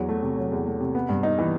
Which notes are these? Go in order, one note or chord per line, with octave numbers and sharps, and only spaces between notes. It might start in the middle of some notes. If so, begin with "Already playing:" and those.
Already playing: E2 F#3
A3
C3
F#3
E2
A3
C3
B3
G2
D#4
E3